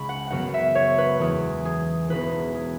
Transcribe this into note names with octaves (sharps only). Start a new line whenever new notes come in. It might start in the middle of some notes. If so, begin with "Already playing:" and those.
Already playing: C#2 C#3 G#3 B5 C#6
F#5
F#2 C#3 F#3 B3 F#5
E5
C#5
B4
E2 E3 G#3 B3 G#4
G#4
E1 E2 E3 B3 B4
G#4